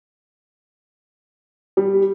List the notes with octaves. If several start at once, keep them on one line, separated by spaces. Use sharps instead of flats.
G3